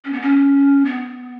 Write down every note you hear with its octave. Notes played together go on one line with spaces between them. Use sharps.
C#4
B3
C#4
B3